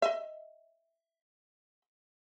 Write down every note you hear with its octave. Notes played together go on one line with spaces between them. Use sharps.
D#5 E5